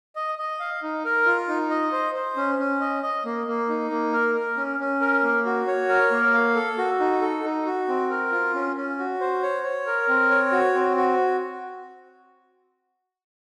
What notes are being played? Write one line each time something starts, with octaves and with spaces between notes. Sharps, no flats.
D#5
D#5
F5
D#4
A#4
F4
D#4
D#5
C5
C5
C#4
C#4
D#5
D#5
A#3
A#3
D#4
A#3
A#4
A#4
C#4
C#4
A#4
A#3
F#4
C#5
A#4
A#3
F5
A4
F#4
D#4
A4
D#4
F#4
C4
A#4
F4
C#4
C#4
F#4
C5
C#5
C#5
A#4
C4
C#5
F#4
C4
F#4